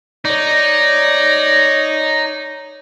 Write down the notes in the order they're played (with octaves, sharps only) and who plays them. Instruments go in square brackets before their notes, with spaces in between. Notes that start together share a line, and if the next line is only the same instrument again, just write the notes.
[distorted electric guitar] D#4 [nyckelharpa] C#5 D5